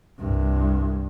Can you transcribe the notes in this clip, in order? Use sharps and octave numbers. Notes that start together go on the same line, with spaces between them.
C2 G2